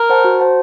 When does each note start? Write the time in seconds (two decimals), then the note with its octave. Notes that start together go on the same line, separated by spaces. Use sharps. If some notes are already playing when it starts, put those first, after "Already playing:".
Already playing: A#4
0.10 C5 F#5 A5
0.24 F#4
0.40 C5 F#5 A5